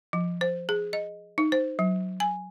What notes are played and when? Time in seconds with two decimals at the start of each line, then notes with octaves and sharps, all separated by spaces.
0.13 F3
0.41 C5
0.69 G#4
0.93 D#5
1.38 D#4
1.52 C5
1.79 F#3
2.20 G#5